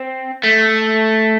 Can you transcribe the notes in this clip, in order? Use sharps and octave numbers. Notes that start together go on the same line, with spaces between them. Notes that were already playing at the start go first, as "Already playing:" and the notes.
Already playing: C4
A3